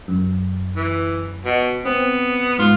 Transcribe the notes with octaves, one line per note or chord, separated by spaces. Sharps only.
F#2
E3
B2
B3 C4
G#2 F4